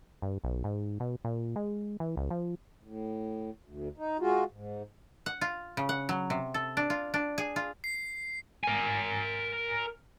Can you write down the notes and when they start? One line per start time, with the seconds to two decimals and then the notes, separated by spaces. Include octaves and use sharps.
0.22 G2
0.44 B1
0.64 G#2
1.00 B2
1.25 A#2
1.56 G#3
2.00 E3
2.17 C#2
2.31 F3
2.83 A2
3.64 D2
3.98 D#4
4.20 G#3 F4 F#4
4.51 G#2
5.26 F#5
5.41 F4
5.77 C#3
5.89 F#5
6.09 F#3
6.30 C3
6.54 A4
6.77 D4
6.90 F4
7.14 D4
7.38 G#4
7.56 F4
7.84 C7
8.64 A#4 G#5